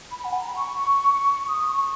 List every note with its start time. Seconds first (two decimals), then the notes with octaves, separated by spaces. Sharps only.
0.11 B5
0.24 F#5
0.32 G#5
0.40 A#5
0.48 B5
0.56 C#6
1.48 D#6
1.70 C#6